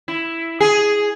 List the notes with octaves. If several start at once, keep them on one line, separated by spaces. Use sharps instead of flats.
E4
G#4